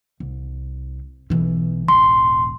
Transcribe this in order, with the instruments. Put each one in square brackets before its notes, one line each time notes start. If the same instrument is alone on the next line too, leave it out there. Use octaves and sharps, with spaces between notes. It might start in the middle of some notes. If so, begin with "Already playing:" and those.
[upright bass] C2
B1 E3
[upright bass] E1 A1 [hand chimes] C6